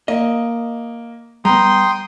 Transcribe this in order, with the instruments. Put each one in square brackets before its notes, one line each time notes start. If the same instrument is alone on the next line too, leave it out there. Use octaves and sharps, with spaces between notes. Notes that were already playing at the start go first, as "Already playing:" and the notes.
[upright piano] A#3 [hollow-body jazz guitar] D#5
[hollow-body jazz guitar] G3 B3 [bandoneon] G5 C6 D#6 [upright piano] A#5